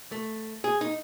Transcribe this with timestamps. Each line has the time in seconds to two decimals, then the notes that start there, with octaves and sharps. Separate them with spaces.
0.12 A3
0.64 G#4
0.81 D#4